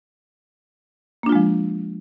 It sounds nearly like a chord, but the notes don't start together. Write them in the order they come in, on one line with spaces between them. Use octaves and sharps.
A#3 D4 F4 G#3 F3